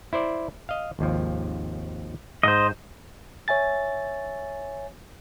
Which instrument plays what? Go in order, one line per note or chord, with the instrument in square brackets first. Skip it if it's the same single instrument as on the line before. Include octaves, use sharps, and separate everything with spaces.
[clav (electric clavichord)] E4 C5 D5
D#5 F5
G#1 D#2 F3
[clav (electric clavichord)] G#2 [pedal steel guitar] C5 D#5
[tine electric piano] C#5 E5 G#5 A6